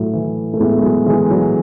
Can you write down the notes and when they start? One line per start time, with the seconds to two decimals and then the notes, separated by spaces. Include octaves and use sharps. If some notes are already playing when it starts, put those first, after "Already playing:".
Already playing: A2 F#3 A3
0.13 E3
0.54 A3
0.60 A2 G#3 B3
0.79 G#3
0.83 F#3 A3
1.06 E3 G#3
1.31 F#3